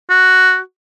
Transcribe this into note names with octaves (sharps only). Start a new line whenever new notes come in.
F#4